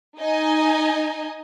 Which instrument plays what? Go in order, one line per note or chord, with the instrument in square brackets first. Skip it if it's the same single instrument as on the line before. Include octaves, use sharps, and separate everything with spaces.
[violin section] D#4 D#5 G#5